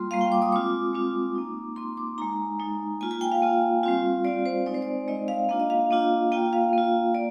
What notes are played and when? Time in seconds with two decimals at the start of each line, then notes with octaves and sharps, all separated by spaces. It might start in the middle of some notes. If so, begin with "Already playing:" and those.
Already playing: G3 A#3 F4 C6
0.11 G3 A#3 F4 F5
0.21 G5
0.32 D6
0.42 D#6
0.52 G#3 C4 F4 D6
0.93 G#3 C4 F4
1.35 A#3 D#4
1.76 A#3 D#4 C6
1.97 D6
2.18 G#3 D#4 A#5
2.59 G#3 D#4
3.01 A#3 F4 G#5
3.11 G#5
3.21 G5
3.32 F5
3.42 A#3 F4
3.83 G3 C4 F4
4.25 G3 C4 F4 D5
4.46 C5
4.66 G#3 C4 D#4 D5
4.74 C5
4.82 D5
5.08 G#3 C4 D#4 D#5
5.28 F5
5.49 A#3 D4 F4 F5
5.60 D#5
5.70 F5
5.91 A#3 D4 F4
6.32 A#3 F4 G5
6.53 F5
6.73 A#3 F4
7.14 A#3 D5